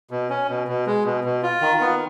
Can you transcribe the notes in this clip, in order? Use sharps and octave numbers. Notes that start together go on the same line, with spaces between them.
B2
C#4
B2
B2
G#3
B2
B2
F4
D#3
B3